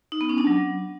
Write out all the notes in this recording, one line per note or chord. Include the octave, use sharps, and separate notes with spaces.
D#4
B3
C#4
D4
F#3